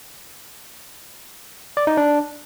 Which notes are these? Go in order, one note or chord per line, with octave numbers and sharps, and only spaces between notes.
D5
D#4
D4